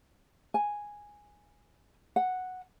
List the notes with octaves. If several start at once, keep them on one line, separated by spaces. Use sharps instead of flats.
G#5
F#5